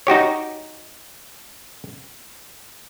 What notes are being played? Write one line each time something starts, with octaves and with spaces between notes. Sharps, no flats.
D#4 F#4 G4 C#5